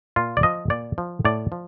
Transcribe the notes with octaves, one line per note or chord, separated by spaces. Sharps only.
A#2 F4
D5
F3 D#5
A#2 D5
F3
A2 D5
F3